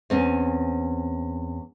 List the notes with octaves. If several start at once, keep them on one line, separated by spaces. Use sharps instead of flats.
E2 C4 C#4